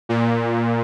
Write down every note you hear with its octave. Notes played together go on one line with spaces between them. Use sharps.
A#2